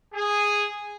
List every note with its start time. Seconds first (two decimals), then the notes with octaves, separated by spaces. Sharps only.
0.14 G#4